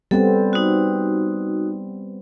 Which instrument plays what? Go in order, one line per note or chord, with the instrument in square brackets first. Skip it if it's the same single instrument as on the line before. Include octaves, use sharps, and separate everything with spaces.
[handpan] G3 B3 C4 [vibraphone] A4
[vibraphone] D#4 F#4